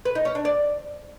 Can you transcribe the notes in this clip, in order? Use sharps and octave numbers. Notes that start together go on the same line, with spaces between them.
B4
D#4
C#4
D4
D5